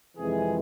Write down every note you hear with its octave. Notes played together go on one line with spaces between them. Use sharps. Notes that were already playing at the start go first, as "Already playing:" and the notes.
F2 C3 E3 G#3 G#4